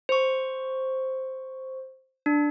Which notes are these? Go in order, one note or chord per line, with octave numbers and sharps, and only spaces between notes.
C5 C#6
D4